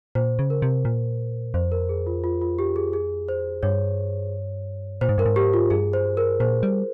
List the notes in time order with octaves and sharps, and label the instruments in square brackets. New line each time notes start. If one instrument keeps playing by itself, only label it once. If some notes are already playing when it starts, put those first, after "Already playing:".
[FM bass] A#2 [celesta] C5
[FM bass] C#3
[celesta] A#4
[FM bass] C3
A#2
[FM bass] F2 [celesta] C5
[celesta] A#4
G#4
F4
F4
F4
G4
G#4
G#4
C5
[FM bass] G2 [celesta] C#5
[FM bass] A#2 [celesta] C5
[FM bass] G#2
[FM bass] G2 [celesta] A#4
[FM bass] G#2
[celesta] G4
F4
[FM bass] G2 [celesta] G#4
[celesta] C5
A#4
[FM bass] A#2 [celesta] C5
[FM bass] G3